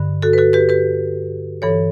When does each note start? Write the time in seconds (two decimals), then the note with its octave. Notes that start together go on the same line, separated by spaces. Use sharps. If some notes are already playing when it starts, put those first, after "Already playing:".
Already playing: G2 D3
0.22 F#4 A4
0.33 B4
0.38 F#4 A4
0.53 G4 B4
0.69 G4 B4
1.62 G2 E3 A4 C#5